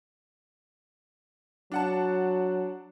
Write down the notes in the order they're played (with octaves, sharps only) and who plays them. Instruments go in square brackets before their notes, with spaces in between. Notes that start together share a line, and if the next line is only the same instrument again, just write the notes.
[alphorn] F#3 [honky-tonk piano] D4 F#5 A5